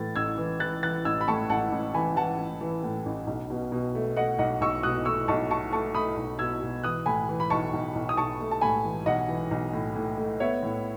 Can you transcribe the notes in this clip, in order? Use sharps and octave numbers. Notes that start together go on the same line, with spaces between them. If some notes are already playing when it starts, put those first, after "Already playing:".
Already playing: A2 E3 A6
A1 E6 G#6
E3
E3 F#6 A6
E3 F#6 A6
A1 E6 G#6
B5
A2 A5 C#6
A1 F#5 A5
A1
E3 G#5 B5
E3 F#5 A5
A1
E3
A2
A1
B1
B2
B2
A3
A3 D#5 F#5
B1 D#5 F#5
B1 C#6 E6
B2 D#6 F#6
A3 C#6 E6
B1 A5 C#6
A3 A5 C#6
A3 A5 C#6
A3 B5 D#6
B1
B2 E6 G#6
B2
E3 D#6 F#6
A2 G#5 B5
E3
B5
B1 A5 C#6
B1
B1
D#6
B1 A5 C#6
A3
A5
A2 G#5 B5
E3
B1 D#5 F#5
E3
B1
A2
A2
A3
B3 C#5 E5
A2